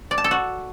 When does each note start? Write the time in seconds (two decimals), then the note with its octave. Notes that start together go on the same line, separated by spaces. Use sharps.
0.11 D5
0.18 A5
0.24 A4
0.31 F#4